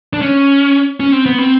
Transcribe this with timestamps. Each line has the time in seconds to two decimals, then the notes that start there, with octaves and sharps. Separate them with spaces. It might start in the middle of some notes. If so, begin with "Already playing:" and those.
0.13 D4
0.22 C#4
1.00 C#4
1.12 C4
1.26 B3
1.38 C4